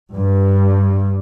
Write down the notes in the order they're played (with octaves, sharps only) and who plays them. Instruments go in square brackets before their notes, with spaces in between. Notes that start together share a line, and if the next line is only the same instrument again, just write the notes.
[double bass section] G2